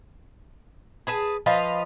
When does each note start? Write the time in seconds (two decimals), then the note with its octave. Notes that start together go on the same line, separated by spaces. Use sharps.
1.07 G#4 B4 A5
1.46 F3 B4 D#5 F5